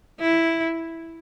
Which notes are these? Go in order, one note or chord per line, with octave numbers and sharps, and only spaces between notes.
E4